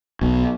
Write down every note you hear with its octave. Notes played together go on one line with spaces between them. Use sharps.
B1 B2